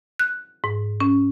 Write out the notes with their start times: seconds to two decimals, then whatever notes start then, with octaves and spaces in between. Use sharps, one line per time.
0.19 F#6
0.64 G#2
1.00 C#4